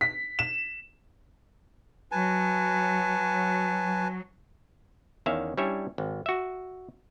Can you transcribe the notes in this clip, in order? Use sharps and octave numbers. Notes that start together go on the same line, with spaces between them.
B6
E7
F#3 B4 G#5 A5
E2 D#3 C#4 E5 F5
G3 C#4 D4 E4 C#5 E5
G#1
F#4 E5